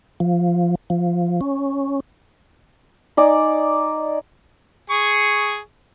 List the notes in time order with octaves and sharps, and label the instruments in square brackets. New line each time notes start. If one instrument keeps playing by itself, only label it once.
[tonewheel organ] F3
F3
C#4
[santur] D#4 D5 G#5
[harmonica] G#4 C#6